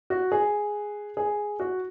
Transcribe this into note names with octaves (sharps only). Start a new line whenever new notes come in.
F#4
G#4
G#4
F#4